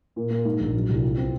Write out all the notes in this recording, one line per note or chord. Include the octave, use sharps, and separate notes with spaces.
A#2
A#3
G#2
A#1
F#3
C2
F4
C4